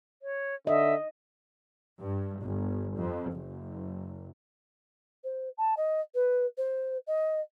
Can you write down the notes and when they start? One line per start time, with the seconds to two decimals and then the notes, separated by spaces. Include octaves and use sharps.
0.22 C#5
0.67 D3 D#5 E5
2.01 G2
2.43 G1
2.98 F2
3.33 F#1
5.24 C5
5.58 A5
5.77 D#5
6.14 B4
6.58 C5
7.07 D#5